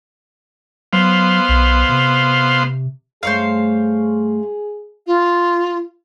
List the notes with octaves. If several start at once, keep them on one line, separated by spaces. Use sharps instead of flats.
F#3 B3 C5 F5
B1
C3
G2 A3 G#4 C5 C#5 F5
F4